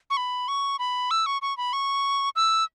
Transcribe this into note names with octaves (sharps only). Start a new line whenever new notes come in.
C#6
B5
C#6
B5
E6
C#6
C#6
B5
C#6
E6